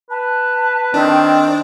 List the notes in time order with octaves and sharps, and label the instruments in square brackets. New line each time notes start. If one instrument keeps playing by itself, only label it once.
[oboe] B4 [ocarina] A5
[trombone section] D#3 C4 [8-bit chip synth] D4